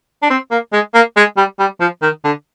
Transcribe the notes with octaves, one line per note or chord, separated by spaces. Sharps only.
D4
C4
A#3
G#3
A#3
G#3
G3
G3
F3
D#3
D3